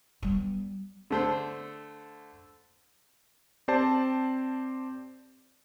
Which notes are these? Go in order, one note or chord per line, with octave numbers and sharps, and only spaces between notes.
G3 B3
D3 A3 C5
C4 G4 C5 D5 A5